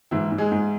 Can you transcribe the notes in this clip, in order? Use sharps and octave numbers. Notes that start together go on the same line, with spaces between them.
G#2 E3 E4
G#2
G#3 G#4
G#2